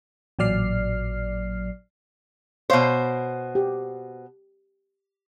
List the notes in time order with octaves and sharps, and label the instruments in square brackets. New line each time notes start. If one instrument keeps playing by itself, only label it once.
[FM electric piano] A1 A#2 F#3 D5 F6 C7
[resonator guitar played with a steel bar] B2 C5 [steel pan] C#5 F5
[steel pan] G4